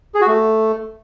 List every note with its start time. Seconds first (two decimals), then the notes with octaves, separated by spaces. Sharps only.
0.15 G#4
0.21 F#4
0.28 A3